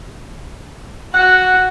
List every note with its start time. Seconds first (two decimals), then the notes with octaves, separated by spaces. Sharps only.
1.14 F#4 F#5